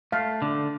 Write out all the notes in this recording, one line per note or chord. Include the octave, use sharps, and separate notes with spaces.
A3 F5
D3